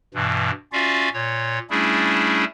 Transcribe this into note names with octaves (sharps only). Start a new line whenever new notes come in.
G2 B2 E3
C#4 F4 F#4 D5 E5 F5
A#2 C#5
G3 A3 C#4 D4 E4 G#4